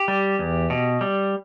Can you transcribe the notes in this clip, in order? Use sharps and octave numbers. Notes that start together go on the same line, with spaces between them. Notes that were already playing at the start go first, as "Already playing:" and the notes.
Already playing: G4
G3
E2
B2
G3